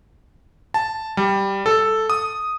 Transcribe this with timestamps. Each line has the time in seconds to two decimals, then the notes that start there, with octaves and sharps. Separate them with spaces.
0.74 A5
1.17 G3
1.66 A4
2.10 D#6